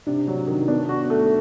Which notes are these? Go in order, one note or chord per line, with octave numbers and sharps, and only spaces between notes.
C3 D4
F#3
D#3
B3 D4
F#4
A3